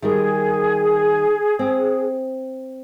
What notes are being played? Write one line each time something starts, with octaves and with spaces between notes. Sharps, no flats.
D#3 G3 G#4 A#4
C4